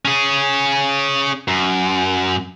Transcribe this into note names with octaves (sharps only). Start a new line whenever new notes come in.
C#4 G#4
F#2